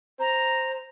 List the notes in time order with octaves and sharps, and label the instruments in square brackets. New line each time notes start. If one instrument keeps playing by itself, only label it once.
[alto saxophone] C5 [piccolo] A#5